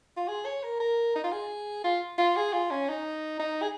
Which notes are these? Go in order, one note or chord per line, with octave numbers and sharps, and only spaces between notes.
F4
G#4
C#5
A#4
A#4
D#4
F4
G#4
F4
F4
G#4
F4
C#4
D#4
D#4
G#4